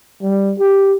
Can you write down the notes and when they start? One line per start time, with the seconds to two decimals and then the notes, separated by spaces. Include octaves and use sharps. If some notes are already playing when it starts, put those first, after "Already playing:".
0.22 G3
0.59 G4